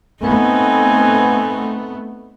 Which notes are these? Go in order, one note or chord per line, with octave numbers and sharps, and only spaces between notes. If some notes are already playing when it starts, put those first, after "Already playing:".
A3 B3 C4 D#4 G#5